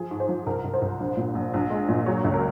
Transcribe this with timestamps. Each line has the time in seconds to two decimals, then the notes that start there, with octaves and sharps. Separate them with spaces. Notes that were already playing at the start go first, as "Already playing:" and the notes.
Already playing: F3 G#4
0.11 G#2
0.20 C5
0.28 F3
0.46 C2 A#4
0.64 C2
0.74 C5
0.82 C2
1.00 A#1
1.17 A#2
1.35 A#1
1.54 A#1
1.70 G#3
1.89 A#2
2.06 F#3 C#5
2.25 C#2
2.34 A#4